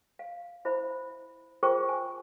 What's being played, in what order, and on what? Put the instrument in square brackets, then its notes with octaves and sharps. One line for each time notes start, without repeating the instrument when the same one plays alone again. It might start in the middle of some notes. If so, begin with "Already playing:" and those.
[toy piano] F5
E4 C5 E5 B5
F4 G#4 A#4 C5 G5 C#6
G#5